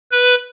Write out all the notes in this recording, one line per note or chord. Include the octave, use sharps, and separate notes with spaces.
B4